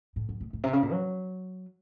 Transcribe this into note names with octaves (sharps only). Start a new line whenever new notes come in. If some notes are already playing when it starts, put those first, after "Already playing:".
A2
F#2
A2
A2
C3
C#3
A#2
F#3